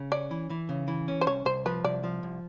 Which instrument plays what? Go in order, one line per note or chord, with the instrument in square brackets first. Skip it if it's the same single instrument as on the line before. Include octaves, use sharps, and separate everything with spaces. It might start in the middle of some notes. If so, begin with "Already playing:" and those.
Already playing: [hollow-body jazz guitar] C#3
[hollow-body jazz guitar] C#4 [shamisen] D5
[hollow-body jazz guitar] E3
E3
C#3
E3
C#4
[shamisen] C5
[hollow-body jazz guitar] C2 [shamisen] C#5
[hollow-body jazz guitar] C2 [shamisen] C5
[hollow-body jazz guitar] F3 [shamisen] B4
[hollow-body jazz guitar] C2 [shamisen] D5
[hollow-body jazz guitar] F3
C2